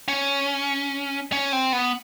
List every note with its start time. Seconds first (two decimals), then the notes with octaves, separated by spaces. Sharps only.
0.08 C#4
1.32 C#4
1.53 C4
1.73 B3